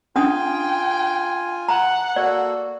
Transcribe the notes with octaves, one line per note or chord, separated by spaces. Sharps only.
C#4 D4 F4 G5 G#5 D#6
F#5 A#5
A#3 F#4 A4 D5